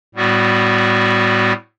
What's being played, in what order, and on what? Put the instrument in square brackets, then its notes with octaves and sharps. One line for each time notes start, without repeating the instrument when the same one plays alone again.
[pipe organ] A2 G3 B3 F#4